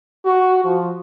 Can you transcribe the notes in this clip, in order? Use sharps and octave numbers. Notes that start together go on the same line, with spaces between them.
F#4
F3